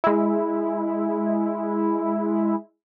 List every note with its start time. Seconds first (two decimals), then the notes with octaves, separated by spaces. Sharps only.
0.04 G#3 E4